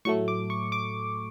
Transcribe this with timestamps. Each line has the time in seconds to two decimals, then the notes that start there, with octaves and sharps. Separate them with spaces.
0.05 A2 F#3 A3 C#6
0.28 D6
0.50 C#6
0.72 D6